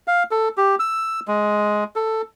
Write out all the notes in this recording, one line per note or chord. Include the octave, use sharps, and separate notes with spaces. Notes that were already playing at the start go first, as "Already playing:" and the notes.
F5
A4
G4
E6
G#3
A4